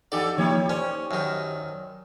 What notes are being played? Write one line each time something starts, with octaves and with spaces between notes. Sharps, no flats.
E2 D#4 G4 A4 D5 F#5
E3 F3 A#3 D#4 G4 C#5
C#4 C5 D5
F#2 D#3